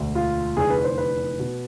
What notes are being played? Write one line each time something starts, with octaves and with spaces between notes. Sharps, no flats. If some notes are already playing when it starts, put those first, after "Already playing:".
Already playing: E1 D2 D3
F4
F1 E2 D3 G#4
B4
C5
B4
B2